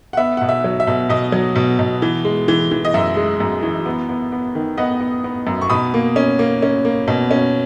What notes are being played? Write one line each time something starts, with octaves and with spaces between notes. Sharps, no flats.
F#5
B3 E5
B2 F#5
E5
F#3
E5
B2
B2 D#5
F#3
B2
B2
E3
G#3
E3
E3
D#5
F#2 E5
G#3
F#2
E3
B3
B3
B3
D#3
B3 D#5 F#5
B3
B3
F#2
C#6
B2 B5 D#6
A#3
C#4
A#3
C#4
A#3
B2
C#4